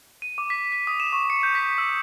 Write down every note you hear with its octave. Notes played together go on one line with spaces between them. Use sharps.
D#7
D6
B6
B6
D#6
E7
C#6
C#7
G6
B6
E6